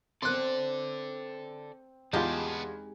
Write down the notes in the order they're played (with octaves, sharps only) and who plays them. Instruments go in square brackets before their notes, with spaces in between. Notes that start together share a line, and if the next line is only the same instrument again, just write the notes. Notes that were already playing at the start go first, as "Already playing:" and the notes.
[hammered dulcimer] C4 [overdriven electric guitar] A4 D5 [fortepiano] C6 F#6
[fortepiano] E2 F4 [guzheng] G#3 D#4 G4 [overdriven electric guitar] B3 A5